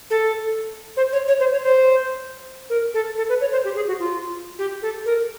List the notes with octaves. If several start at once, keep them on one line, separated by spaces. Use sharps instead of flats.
A4
C5
C#5
C#5
C5
C#5
C5
A#4
A4
A4
B4
C#5
C5
G4
G#4
F#4
F4
G4
A4
A#4